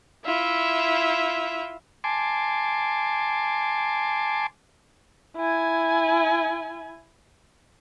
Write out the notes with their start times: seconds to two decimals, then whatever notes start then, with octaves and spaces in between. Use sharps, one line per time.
0.23 E4 F4 E5
2.04 G#5 A5 C6 D6
5.36 E4 G#5